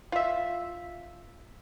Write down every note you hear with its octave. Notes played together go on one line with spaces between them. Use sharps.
F4 E5